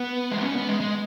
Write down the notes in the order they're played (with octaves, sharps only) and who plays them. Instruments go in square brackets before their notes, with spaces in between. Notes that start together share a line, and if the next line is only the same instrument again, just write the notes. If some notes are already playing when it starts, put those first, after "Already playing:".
Already playing: [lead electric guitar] B3
G#3
B3
C#4
B3
G#3
G#3